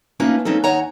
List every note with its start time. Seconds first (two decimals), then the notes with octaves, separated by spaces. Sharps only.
0.20 A3 A#3 C#4 D#4 F4 B4
0.45 A#3 C4 C#4 D#4 A4
0.64 D#2 D#4 C#5 F#5 G#5 A#5